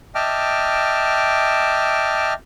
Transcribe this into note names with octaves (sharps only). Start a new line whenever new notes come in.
D#5 E5 G5 A5 D6 F6